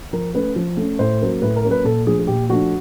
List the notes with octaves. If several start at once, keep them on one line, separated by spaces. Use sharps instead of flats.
F3 A#4
A3 C#4 B4
F3
A3 C#4
A2 C5
F#3 A#3 C#4
A2 B4
A#4
F#3 A#3 C#4
B4
A#2 A4
F3 A3 D4 G#4
G#4
A#2 G4
F3 A3 D4 F#4